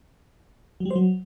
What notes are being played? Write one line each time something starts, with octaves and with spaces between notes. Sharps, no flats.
F#3
G3
C5
F#3